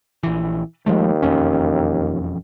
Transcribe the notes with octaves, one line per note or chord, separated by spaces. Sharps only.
A#1 E3
D#2 F3 G#3 A3
E1 F2 C#4